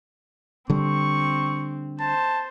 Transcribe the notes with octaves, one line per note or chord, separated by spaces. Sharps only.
D3 G3 C4 C#6
C5 A5